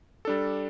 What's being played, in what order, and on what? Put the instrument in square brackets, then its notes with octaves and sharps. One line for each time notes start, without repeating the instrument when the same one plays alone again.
[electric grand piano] G3 D4 A4